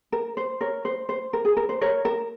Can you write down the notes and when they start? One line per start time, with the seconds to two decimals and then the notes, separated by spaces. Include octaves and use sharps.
0.12 A#4
0.37 C5
0.61 A#4 C#5
0.85 C5
1.09 C5
1.33 A#4
1.45 G#4
1.57 A#4
1.69 C5
1.81 A#4 C#5
2.05 A#4